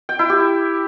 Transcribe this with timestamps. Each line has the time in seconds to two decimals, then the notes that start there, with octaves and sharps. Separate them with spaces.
0.09 G5
0.19 E4
0.29 G4